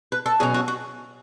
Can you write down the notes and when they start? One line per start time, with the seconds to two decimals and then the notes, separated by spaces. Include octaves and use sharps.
0.12 B4
0.26 A4
0.40 B2 F#3 C#4 G#4
0.54 F#4
0.68 F#4